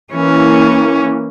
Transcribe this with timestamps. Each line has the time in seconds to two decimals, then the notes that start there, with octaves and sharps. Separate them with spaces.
0.13 E3 A#3 C#4